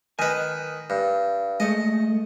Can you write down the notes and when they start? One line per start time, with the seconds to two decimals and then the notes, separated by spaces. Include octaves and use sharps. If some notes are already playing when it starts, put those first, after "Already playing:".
0.19 D#3 B4 D#5 G#5
0.90 G2
1.60 G#3 A3 D#5